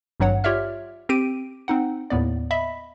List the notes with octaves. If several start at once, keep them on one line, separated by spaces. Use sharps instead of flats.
G#1 G2 F#3 C#5 F#5
F4 G4 C#5 D5 E5 F6
C4 G4 D7 D#7
C4 D#4 F#5
D#2 A2 B3 D5
D#5 E5 B5 B6